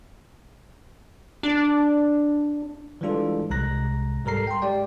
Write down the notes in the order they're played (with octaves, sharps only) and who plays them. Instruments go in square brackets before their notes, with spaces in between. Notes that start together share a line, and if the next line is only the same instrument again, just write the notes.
[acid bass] D4
[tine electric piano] E3 G3 G#3 D4 F4 A4
C2 C3 G#3 A#5 F#6 A#6
G#2 G3 A4 A#4 A#5 C7
G5 C6
G#3 G4 D5 G5